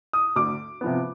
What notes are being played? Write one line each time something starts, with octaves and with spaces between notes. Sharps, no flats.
D#6
D2 D6
C3 F3 B3